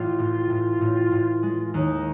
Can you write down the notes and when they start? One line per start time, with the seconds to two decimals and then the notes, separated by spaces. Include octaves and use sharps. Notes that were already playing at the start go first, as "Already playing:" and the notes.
Already playing: A1 F4
0.19 A2
0.50 A2
0.81 A2
1.12 A2
1.43 G#3
1.74 D#2 D#4